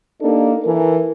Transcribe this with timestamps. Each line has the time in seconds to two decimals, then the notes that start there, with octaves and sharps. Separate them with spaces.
0.21 A#3 D4 D#4 G4 A4
0.64 E3 A4 A#4